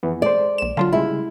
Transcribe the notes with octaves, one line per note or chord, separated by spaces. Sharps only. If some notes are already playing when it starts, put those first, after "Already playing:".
F2 E3 B3
G#3 A4 C5 D5
A#1 E7
D3 F#3 F4 F5 A5 C6
C#3 G3 G#3 E4